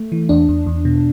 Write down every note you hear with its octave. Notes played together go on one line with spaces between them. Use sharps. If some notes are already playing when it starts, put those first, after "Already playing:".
Already playing: A3
E3
E2 D4
E2
E2
B2